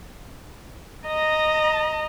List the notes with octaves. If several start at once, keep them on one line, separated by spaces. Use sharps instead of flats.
D#5 A#5